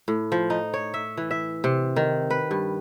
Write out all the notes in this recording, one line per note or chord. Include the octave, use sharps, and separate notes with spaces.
A2
F3
D#4
C#5
E5
E3
E5
C3
D#3
B4
G2